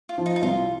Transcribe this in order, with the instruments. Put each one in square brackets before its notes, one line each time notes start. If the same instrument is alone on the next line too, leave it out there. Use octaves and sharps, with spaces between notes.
[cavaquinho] F4
[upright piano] F3
[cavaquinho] D#4
D#4
[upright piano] C2 [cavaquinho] F4